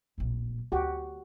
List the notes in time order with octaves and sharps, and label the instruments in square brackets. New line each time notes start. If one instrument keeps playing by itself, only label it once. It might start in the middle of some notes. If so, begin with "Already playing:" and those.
[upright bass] D1 A#1
[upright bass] D2 [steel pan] F#4 G4